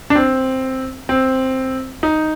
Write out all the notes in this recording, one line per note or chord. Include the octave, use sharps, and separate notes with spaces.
D4
C4
C4
D#4